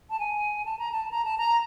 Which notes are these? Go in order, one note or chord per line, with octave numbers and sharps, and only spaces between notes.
A5
G#5
A5
A#5
A5
A#5
A5
A#5